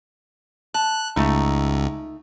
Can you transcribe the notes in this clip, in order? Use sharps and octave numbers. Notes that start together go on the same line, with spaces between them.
A5 F#6
C#2 A3 D#4